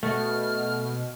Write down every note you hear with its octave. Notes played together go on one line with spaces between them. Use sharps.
B2 A3 F6